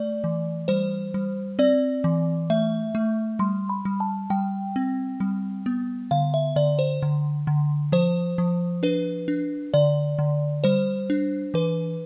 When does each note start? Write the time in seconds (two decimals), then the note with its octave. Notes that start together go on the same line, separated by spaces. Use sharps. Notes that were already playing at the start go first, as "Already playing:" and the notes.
Already playing: A3 D5
0.24 E3
0.68 G3 C5
1.14 G3
1.59 C4 D5
2.04 E3
2.50 A3 E5
2.95 A3
3.39 G3 C6
3.69 B5
3.85 G3
4.00 A5
4.30 G3 G5
4.76 C4
5.20 G3
5.66 B3
6.11 D3 F5
6.34 E5
6.56 D3 D5
6.79 C5
7.02 D3
7.47 D3
7.92 F3 C5
8.38 F3
8.83 D4 B4
9.28 D4
9.74 D3 D5
10.19 D3
10.64 G3 C5
11.10 D4
11.54 E3 B4